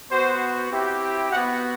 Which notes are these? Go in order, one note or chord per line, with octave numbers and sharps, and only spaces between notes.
B3 F#4 C5
C4 E4 G4
B3 F#4 F#5